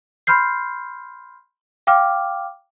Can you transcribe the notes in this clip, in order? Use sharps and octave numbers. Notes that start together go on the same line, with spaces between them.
B5 C6 F6 G6 C7
F5 G5 D6 F6